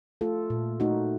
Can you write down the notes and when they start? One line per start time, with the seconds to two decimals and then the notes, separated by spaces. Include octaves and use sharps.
0.21 A3 F4 A4
0.50 A#2
0.80 A3 D#4 F#4